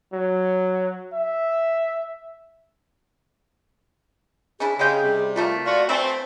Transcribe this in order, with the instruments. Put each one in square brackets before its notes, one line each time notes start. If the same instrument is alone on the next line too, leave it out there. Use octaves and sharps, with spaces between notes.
[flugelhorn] F#3
E5
[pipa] C#4 D4 E4 [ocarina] G#4
[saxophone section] C#3 [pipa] G#3 G4 G5 [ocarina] G#4
[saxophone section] C3 G3
[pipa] F3 A3 A#3 [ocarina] F4
[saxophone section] F4 F#4 [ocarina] D5
[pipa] E3 A3 [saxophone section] C4 [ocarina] C5